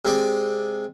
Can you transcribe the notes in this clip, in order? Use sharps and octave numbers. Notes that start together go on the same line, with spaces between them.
C3 G#3 D5